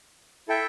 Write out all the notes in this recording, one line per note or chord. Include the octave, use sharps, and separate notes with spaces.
E4 A4 E5 G5